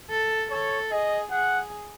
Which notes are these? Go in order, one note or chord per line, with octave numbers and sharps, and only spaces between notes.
A4
A4 C#5
G#4 D#5
G#4 F#5